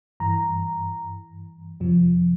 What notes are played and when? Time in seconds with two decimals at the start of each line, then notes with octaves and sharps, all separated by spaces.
0.20 G2 E3 A#5
1.80 F2 C3 F3